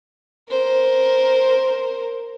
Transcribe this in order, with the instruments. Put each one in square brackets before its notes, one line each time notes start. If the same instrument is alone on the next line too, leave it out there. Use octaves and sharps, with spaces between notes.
[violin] A#4 C5